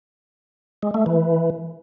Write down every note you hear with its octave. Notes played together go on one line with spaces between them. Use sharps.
G#3
A3
E3